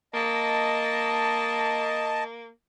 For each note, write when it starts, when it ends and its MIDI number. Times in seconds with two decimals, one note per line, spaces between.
0.14 2.49 58
0.14 2.24 75
0.14 2.24 81